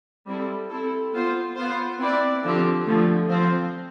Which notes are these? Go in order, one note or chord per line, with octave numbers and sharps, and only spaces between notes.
G3 C4 E4 A4
C4 E4 A4
B3 F4 C5
B3 F4 C5
C4 E4 B4 D5
D3 F3 C4 G4
D3 F3 A3
F3 C4 F4 C5